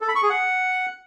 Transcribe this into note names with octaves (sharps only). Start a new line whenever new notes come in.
A4
B5
C#6
G#4
F#5